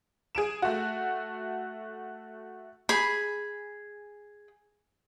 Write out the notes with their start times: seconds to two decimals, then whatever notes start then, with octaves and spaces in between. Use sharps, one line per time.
0.35 G#4 D7 E7
0.62 A3 F#4
2.89 G#4 B5